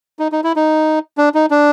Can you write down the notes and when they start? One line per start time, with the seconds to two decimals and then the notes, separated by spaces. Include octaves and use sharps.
0.19 D#4
0.32 D#4
0.44 E4
0.56 D#4
1.18 D4
1.34 D#4
1.51 D4